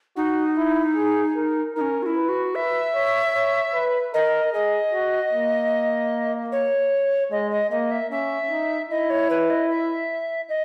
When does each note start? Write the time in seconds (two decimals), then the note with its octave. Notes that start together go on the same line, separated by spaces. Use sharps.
0.17 D#4 F#4
0.57 E4
0.96 G#4
1.36 A#4
1.76 D#4 A#4
1.81 C#4
2.02 F#4
2.06 E4
2.16 B4
2.29 F#4
2.55 B4 E5
2.95 C#5
3.35 C#5
3.74 B4
4.14 A#4 D#5
4.54 G#4 D#5
4.93 F#4
5.33 A#3
6.52 C#5
7.31 G#3 D#5
7.51 D#5
7.71 A#3 D#5
7.91 E5
8.11 C#4 E5
8.50 D#4
8.90 E4 D#5
9.10 C#5
9.30 B4
9.50 D#5
9.70 E5
10.49 D#5